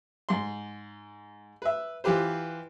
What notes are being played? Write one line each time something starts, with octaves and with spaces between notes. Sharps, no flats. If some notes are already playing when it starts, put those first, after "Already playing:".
G#2 C6
B4 E5
E3 F4 G4 B4 C5